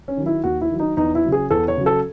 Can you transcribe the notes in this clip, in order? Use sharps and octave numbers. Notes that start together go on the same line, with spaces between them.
C#4
D#3 F#3
E4
D#2 F#4
E4
D#3 F#3
D#4
E2 D#4
E4
C#3 F#3
G#4
E2 A4
C#5
C#3 F#3
A4